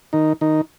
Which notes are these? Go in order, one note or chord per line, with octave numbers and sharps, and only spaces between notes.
D#3 D#4
D#3 D#4